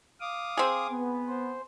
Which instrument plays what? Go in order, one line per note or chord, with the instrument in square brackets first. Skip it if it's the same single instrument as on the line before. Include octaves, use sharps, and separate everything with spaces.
[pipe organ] F5 D6 D#6
[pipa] C4 G#4
[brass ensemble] B3
[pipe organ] C5